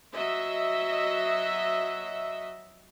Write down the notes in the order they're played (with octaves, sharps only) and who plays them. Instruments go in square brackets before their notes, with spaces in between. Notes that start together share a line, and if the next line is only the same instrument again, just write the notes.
[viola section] F#3 D#5 E5